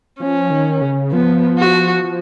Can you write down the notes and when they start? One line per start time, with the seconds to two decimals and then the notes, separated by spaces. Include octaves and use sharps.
0.20 F3 C#4
0.51 D#3
0.81 C#3
1.12 F3 B3
1.58 F#4
2.04 F3